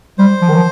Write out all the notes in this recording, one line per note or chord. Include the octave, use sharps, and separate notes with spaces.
G3 C5
F3
D#3
F3